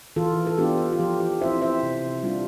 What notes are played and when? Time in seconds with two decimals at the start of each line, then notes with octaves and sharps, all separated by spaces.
0.16 E3 F4 A4
0.47 A4
0.58 B3 D4 F4 G4
0.92 F4
0.99 F3 G4
1.20 G4
1.41 C4 E4 C5 E5
1.62 C5 E5
1.83 C3
2.23 G3 D4 F4